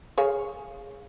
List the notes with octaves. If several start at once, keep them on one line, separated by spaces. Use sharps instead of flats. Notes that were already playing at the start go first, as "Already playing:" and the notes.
G#4 C#5 F5